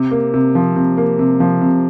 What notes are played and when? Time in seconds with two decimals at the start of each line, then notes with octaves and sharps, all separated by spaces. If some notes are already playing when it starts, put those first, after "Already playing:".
Already playing: C3
0.11 A#3
0.34 C3
0.55 F3
0.76 C3
0.97 A#3
1.19 C3
1.40 F3
1.61 C3